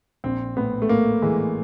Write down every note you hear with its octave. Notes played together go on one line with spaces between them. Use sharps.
A#1 C4
A2 B3
A3
A2 A#3
E3 G#3